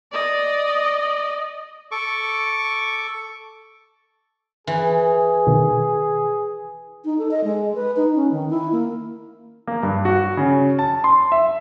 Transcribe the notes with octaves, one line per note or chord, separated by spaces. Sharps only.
D5 D#5
A4 C#6 D6
E3 G#4
B2 D#3
D#4
A4
D#5
G#3
B4
D#4
C#4
D#3
E4
A#3
A#3
G2
F#4
C#3
A5
C6
E5